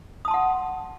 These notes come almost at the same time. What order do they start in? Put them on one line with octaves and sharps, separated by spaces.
D#6 A5 C6 F#5